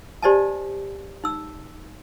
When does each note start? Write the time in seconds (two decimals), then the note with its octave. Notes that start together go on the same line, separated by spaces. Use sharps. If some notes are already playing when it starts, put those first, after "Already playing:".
0.23 G4 C5 D5 D#5 G#5 A5
1.24 D#4 E6